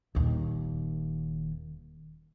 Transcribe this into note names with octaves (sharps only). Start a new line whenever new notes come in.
D#1 D#2